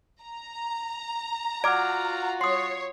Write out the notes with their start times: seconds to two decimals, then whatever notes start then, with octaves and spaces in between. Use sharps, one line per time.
0.22 A#5
1.64 F4 F#4 D5 F#5 D6 F6 D7
2.41 C#5 C6 D#6 C7